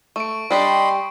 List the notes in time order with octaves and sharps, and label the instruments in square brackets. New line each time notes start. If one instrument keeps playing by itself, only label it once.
[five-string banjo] A3 [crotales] C#6 D7
[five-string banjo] G3 D4 G4 [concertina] D#5 B5 C6 [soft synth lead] G5